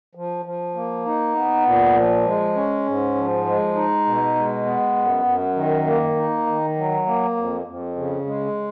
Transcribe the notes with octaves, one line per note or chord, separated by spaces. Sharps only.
F3
F3
A#3
D#4
B3
A#2
F3
G#3
C#4
G#2
F3
G#3
D#4
B2
G#3
B3
F#2
F#2
D#3
A#3
D#4
D#3
F#3
A#3
F2
F2
C#3
G#3